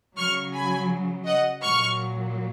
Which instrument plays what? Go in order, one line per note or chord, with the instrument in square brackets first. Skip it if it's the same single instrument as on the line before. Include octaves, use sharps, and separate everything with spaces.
[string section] C#3 F#3 C#6 F6
G#5 B5
D#5 F#5
A#2 F#3 C#6 F6